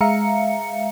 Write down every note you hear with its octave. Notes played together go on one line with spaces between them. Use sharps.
G#3 E5 F5 A#5 C#7